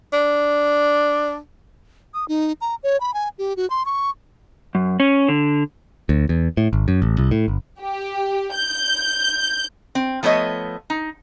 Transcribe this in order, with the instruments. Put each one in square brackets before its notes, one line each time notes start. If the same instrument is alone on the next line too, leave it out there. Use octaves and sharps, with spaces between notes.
[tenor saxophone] D4
[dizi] D#6
D#4
A#5
C#5
B5
G#5
G4
F#4
C6
C#6
[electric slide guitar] F#2
C#4
D3
[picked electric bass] D2
E2
A2
G#1
F#2
A1
C2
A2
G1
[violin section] G4
G6
[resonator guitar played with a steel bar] C4
F3 A3 B3 C#5 D#5
D#4